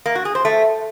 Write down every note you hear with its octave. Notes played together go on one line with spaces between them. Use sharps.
A#3
F#4
G#4
C5
A3